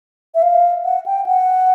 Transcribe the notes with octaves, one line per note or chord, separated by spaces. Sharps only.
E5
F5
F#5
G5
F#5